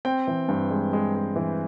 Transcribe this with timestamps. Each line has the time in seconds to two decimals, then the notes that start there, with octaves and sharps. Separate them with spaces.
0.05 C4 G5
0.27 E3
0.48 G2
0.70 G#3
0.93 G#3
1.15 G#3
1.36 E3